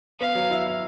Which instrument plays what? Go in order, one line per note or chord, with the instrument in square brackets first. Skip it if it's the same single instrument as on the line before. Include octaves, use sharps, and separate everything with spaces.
[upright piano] B3 [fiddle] F5
[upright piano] F#3
E4
E4